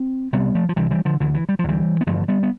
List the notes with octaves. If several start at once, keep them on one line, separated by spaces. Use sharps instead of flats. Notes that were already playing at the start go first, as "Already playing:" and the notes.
Already playing: C4
C2 C3 G3 B3
F3 A3
F3
C2 C3 E3 G3
E3 G3
D3 F3
D2 D3 E3
E3
G3
F3
D2 D3 E3 G3
B3
A1 G2 D3 F3 A3
G3 B3
B3